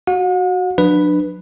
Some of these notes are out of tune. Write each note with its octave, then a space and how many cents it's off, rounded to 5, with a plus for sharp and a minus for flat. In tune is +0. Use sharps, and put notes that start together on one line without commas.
F#4 +0 F#5 -45
F#3 -30 D4 +25 B4 +0